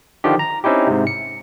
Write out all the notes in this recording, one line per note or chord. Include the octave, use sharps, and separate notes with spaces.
D3 D#3 F3 G4
A#5
C4 C#4 D#4 E4 G4
G#2 C3
C#7